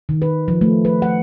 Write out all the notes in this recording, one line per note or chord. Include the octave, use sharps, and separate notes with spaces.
D#3
B4
F3
A3
B4
F#5